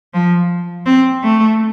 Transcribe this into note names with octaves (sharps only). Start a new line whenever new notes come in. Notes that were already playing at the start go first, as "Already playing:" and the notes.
F3
C4
A3